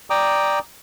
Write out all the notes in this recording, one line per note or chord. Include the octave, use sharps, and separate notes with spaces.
D5 G5 A#5 D6 D#6